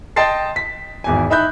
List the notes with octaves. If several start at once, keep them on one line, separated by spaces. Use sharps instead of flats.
D#5 G5 A5 C6 A6 C7
B6
G#1 E2 G#5
D#4 E5 B5 F#6 G6